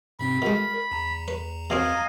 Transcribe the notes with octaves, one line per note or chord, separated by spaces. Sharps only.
G#2 C3 C4 B5
B2 G#3 A#4
E2 A#5
B4
B2 A#3 C4 D#5 F5 G#5